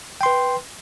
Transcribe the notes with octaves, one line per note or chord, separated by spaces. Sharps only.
B4 G5 C6